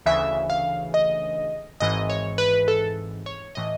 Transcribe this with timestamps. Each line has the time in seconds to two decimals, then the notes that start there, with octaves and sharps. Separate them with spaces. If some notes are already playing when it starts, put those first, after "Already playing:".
0.06 D2 C#3 E3 E5
0.50 F5
0.94 D#5
1.80 G#1 G#2 E3 D#5
2.10 C#5
2.38 B4
2.68 A4
3.26 C#5
3.55 A2 E3 D#5